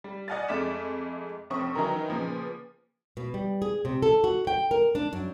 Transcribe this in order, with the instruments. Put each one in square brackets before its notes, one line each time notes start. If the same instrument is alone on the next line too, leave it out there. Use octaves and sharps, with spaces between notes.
[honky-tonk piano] G3
D5 D#5 F#5 G#5 F6 A6
F2 G#3 A3 D6 B6 E7
F1 C4 C#6 D#6
D#3 E3 F#3 B3 D#4 A#4
A#2 C#3 F3 B3
[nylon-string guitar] B2
G3
G#4
C3
A4
F#4
G5
A#4
D4
F#2